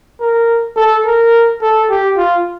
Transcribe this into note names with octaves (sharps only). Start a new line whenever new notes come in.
A#4
A4
A#4
A4
G4
F4